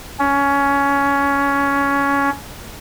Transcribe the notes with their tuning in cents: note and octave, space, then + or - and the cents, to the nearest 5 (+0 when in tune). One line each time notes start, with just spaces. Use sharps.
C#4 +15